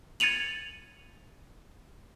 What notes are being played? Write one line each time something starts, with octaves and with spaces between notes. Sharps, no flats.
G#6 A6 C#7 D#7 F7 F#7